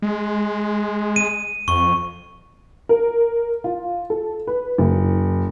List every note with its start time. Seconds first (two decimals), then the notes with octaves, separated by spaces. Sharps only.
0.02 G#3
1.16 D#7
1.68 F2 C#6
2.89 A#4
3.64 F4
4.10 A4
4.47 B4
4.78 F#1